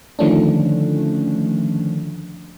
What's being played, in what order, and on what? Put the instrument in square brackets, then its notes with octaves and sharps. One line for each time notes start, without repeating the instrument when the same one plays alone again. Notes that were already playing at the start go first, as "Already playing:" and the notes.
[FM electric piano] D3 D#3 F3 A3 C#4 D4